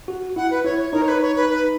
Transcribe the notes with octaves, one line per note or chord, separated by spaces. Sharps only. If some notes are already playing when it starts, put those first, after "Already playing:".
F#4
E4 F#5
B4
E4 C#5
C#5
D#4 A#4
C#5
B4
C#5
B4
B4